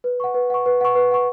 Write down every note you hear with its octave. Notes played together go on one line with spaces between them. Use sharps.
B4
F#5 C#6
B4
F#5 C#6
B4
F#5 C#6
B4
F#5 C#6